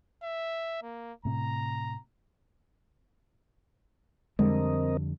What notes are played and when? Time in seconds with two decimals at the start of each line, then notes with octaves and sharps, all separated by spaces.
0.23 E5
0.83 A#3
1.25 A2 C3 A#5
4.39 F2 D3 G3 G#3 C4 A#4 D#5